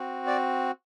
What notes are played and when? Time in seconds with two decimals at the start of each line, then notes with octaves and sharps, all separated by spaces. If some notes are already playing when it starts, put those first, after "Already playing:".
Already playing: C4 F#4
0.27 D5